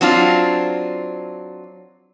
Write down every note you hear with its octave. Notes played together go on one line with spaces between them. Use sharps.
F#3 C4 D4 F4